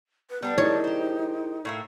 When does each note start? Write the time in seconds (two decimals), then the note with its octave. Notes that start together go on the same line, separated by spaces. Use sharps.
0.30 B4
0.42 G3 B3 D4 A4
0.58 D#4 E4 G#4 A#4 C#5
0.84 G4 C5
1.65 A2 A#3 E5